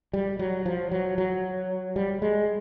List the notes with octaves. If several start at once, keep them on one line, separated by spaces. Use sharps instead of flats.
G3
F#3
F3
F#3
F#3
G3
G#3